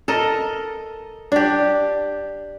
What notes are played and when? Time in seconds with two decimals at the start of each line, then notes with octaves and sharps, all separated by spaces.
0.08 A4 A#4 D#5
1.32 D4 G4